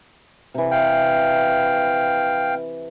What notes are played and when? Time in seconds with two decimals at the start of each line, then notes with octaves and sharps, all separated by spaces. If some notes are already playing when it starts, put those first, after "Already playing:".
0.54 C3 E3
0.71 F5 G5